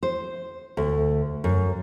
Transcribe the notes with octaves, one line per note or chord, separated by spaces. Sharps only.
C5
D2
F#2